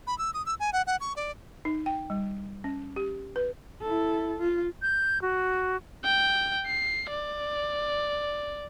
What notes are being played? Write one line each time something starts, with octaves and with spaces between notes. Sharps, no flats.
B5
E6
D#6
E6
G#5
F#5
F#5
C#6
D5
D#4
G5
G3
C#4
G4
B4
E4 A4
F4
G6
F#4
G5
C7
D5